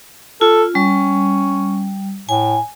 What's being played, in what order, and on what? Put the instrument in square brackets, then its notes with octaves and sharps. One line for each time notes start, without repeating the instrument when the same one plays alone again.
[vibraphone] F4 [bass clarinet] A4
[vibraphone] G3 [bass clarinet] C#4
[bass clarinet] A2 [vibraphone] G#5